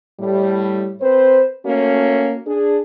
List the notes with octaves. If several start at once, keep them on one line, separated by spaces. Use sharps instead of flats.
A2 G3
C4 B4 C5
A3 A#3 C#4 F#4
D4 G#4